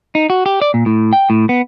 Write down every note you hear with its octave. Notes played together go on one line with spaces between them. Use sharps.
D#4
F#4
G4
D5
A#2
A2
G5
A2
B3